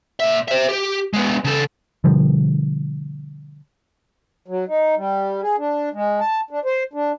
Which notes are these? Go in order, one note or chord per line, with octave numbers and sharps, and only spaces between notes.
A#2 E5
C5 E5
G4
G#3 B3
C#3 A4
B2 D3 F3 G3
F#3
D#4
G3
G#4
D4
G#3
A5
D4
C5
D4